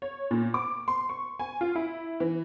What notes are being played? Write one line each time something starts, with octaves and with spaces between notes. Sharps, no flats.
C#5
A#2
D6
C6
C#6
G#5
F4
E4
E3